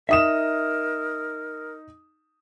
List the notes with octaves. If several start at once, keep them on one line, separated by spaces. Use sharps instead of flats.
D#4 A#4 E5 D#6 E7